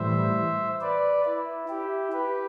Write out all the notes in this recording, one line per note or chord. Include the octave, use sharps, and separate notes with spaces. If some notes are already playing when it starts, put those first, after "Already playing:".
Already playing: A2 E3 G3 C5 E5
B4 D5
E4
E4 G4
G4 B4